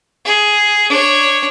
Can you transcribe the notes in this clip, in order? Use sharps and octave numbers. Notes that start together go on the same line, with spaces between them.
G#4
D4 C#5